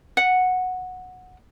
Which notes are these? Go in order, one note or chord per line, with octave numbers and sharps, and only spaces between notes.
F#5